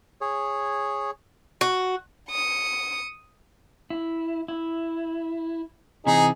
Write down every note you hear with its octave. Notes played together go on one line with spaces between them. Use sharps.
G#4 C#5
F#4
D#6 C#7
E4
E4
C3 E3 C4 D#4 G#4